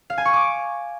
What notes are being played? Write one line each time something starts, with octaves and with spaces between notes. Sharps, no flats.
F5
G#5
C#6
D6